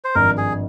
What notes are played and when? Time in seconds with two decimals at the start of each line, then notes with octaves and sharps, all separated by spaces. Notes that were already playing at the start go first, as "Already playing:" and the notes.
0.04 C5
0.15 G#1 G2 F3 A#4
0.38 G#4